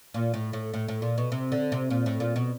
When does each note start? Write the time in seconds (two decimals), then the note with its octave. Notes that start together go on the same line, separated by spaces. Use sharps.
0.14 A#2
0.34 A2
0.53 A2
0.74 A2
0.88 A2
1.02 A#2
1.18 B2
1.32 C3
1.52 D3
1.72 C3
1.90 A#2
2.06 A2
2.20 A#2
2.36 B2